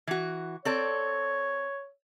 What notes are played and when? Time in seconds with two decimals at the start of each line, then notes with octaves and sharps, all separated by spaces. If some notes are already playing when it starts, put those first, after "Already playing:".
0.07 E3 F#4
0.65 C4 A4 C#5 D5